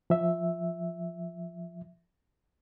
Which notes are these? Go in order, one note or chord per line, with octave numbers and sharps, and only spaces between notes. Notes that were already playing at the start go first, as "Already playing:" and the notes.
F3 E5